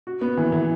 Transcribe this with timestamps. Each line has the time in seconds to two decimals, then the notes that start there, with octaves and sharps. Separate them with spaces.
0.07 F#4
0.21 B3
0.37 E3
0.52 E3